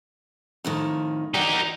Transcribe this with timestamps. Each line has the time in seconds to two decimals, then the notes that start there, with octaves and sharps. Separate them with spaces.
0.64 F2 A2 D#3
1.34 E3 D#4 F#4 G4 D5